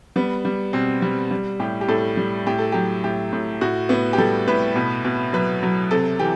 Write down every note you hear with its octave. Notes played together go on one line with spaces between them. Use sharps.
G3 B3
G3
B2 C4
G3
G3
A2 G4
G4
A2 A4
G3
A2 G4
A4
F#3 G4
A2 G4
A2
A2 F#4
A2 B3
G4
G3 A4
A2 B4
B2
B2
F#3 B4
F#3
C3 A4
E3 G4